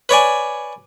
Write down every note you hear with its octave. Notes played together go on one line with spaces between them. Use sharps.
B4 C#5 D5 G#5